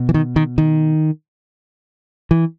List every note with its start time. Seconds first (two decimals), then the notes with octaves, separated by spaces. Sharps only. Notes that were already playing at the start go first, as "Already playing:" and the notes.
Already playing: B2
0.09 E3
0.14 D#3
0.36 D#3
0.58 D#3
2.31 E3